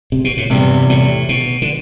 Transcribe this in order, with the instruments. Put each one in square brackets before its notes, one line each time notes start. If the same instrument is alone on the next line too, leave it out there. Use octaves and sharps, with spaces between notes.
[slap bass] C3
B2
A2
[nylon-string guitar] E2 C3 G3 [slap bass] G2
[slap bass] A2
B2
D3